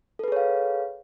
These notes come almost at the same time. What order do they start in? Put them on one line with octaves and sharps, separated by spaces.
A4 B4 G#4 C#5 F5